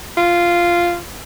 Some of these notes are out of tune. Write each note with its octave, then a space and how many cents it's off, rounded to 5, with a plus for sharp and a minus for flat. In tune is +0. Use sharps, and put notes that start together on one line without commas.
F4 -10